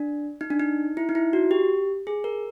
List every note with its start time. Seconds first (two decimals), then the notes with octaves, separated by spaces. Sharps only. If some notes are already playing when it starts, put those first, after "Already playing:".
Already playing: D4
0.41 D#4
0.50 D4
0.60 D#4
0.97 E4
1.09 D#4
1.15 E4
1.33 F#4
1.51 G4
2.07 G#4
2.24 A#4